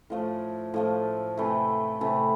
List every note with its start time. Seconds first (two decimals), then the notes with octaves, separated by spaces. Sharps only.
0.10 A2 F3 A3
0.74 A2 F3 A3
1.37 C3 E3 A3
2.01 C3 E3 A3